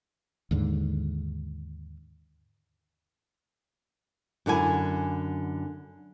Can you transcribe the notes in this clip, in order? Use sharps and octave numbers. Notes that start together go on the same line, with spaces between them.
D#2 G#2 D3
F#2 D3 E4 G#5